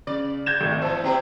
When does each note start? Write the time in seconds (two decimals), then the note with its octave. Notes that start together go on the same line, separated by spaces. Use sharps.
0.07 C#3 D5
0.46 G6 G#6 E7
0.61 G#1 A2
0.82 E3 C5 E6
1.04 B2 C4 E4 G4